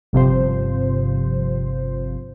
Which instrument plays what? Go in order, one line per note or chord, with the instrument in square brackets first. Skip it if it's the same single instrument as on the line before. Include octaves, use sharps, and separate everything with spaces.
[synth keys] G1 C3 F3 C5